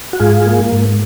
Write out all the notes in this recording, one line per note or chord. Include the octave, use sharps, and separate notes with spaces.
F#4
G#2 F4 G#4
A#3
G#2